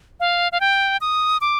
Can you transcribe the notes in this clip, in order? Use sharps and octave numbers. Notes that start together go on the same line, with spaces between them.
F5
F5
G5
D#6
D6